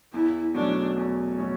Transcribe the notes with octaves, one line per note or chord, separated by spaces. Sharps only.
E2 E4
B2 F#3 A3 C#4 D4
E2
B2 F#3 A3 C#4